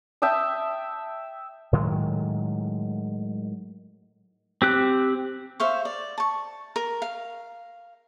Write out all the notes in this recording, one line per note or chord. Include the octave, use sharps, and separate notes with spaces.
E5 G5 A5 D#6
A2 D#3 F#3 G#3
C4 G4 F#6
C5 E5 F5 C#6
D5
A5 C#6
A#4
F5